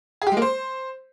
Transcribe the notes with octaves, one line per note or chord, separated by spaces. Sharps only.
G#4
G4
G#3
A#3
C5